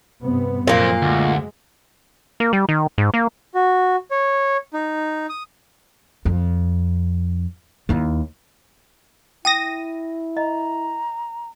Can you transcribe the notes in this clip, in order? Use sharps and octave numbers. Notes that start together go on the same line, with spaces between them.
G2 C3 B3
F#2 A#2 F3 F#3 A#3 C4
D2 G#3
A#3
G3
D#3
G#2
A#3
F#4
C#5
D#4
D#6
F2
D#2 E4
E4 G5 D#6 A#6 D#7
D#5 A#5